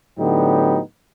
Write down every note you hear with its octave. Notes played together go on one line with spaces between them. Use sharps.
A2 D3 F#3 B3 D#4 G4